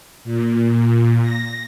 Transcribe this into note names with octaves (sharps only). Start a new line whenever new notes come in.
A#2
A#6